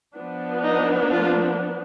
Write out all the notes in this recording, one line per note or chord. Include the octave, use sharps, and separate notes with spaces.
F3 B3 D4
D#4
F4